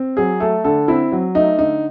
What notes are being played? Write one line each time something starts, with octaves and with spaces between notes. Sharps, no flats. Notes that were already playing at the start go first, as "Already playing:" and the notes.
Already playing: C4
F#3 G#4
A3 A4
D3 A4
C4 E4
F#3
A3 D#4
D3 D#4